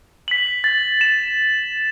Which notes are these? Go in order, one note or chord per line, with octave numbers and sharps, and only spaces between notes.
B6 F#7
A6
E7